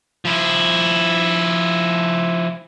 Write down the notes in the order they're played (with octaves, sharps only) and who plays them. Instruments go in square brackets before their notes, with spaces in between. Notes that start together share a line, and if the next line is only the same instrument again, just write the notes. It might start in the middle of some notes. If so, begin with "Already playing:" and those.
[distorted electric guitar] F3 E4